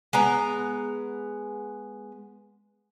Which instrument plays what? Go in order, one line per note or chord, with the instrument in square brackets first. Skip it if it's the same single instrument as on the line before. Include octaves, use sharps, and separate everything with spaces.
[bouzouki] G#3 B3 A#5